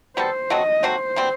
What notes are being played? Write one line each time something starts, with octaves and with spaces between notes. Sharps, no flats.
G3 B3 F#4 A4 C5
F#3 A3 C4 F#4 D#5
F#3 A3 C4 F#4 C5
B2 G3 C4